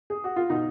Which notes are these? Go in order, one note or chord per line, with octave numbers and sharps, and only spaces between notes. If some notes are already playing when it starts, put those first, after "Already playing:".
G#4
F#4
F4
B2 D#4